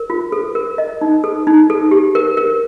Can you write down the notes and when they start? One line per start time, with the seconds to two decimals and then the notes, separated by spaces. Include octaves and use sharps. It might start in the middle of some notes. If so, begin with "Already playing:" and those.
Already playing: A#4
0.10 F4
0.32 A4
0.55 A#4
0.78 D#5
1.01 D#4
1.24 A4
1.47 D#4
1.70 A4
1.91 G4
2.15 A#4
2.37 A#4